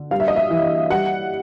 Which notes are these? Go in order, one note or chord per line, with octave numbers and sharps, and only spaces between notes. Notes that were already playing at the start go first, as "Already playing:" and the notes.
Already playing: D3
G3 F5
E5
D#5
E5
E3
G3 F#5